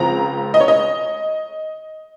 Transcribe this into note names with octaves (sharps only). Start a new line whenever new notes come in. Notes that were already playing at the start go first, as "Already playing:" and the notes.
Already playing: C#2 C#3 F3 C4 A#5
D#5
C#5
D#5